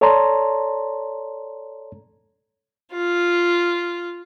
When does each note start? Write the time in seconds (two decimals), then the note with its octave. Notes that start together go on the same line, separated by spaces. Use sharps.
0.01 A4 C#5 D5 A5 A#5 C6
2.93 F4